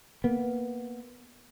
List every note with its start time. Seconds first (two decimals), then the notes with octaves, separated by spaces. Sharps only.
0.24 A#3 B3